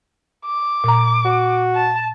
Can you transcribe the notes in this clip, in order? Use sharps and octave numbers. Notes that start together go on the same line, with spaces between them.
D6
A#2 A#5
F#4
A5